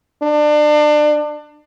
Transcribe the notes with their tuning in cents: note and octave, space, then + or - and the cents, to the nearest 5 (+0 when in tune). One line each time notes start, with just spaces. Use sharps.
D4 +30